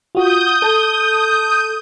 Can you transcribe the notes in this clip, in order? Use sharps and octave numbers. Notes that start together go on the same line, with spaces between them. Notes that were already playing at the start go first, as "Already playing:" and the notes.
F4 F#4 D#6 G6
A4 A5